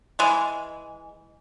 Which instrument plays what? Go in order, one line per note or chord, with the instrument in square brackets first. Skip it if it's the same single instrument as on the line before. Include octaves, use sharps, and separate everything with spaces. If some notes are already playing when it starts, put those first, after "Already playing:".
[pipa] E3 G#3